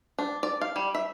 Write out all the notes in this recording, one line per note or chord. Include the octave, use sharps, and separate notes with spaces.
D4
D5
F5
G3
E5